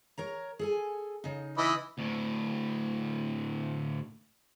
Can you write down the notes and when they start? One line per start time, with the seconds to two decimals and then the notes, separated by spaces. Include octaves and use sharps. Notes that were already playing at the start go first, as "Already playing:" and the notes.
0.18 A#4 C#5 A#5
0.59 G#4 A4 G#5
1.24 C#3 D#4
1.57 E3 D#5 B5
1.98 D2 A2